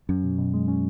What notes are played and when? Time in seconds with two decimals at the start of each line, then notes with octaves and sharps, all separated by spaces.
0.09 F#2 C#4
0.24 B2
0.38 B2
0.54 G#3
0.68 C#4